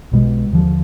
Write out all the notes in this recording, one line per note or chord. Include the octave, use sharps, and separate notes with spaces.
B1 B2 G#3
D#2 D3 F3